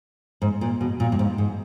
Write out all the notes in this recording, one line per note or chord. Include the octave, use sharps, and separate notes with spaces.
G#2
A#2
B2
A#2
G2
G#2
G#2